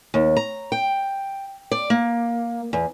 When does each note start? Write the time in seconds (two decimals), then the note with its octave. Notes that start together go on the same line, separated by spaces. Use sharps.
0.14 D#2
0.36 A#5
0.72 G5
1.71 D5
1.90 A#3
2.73 E2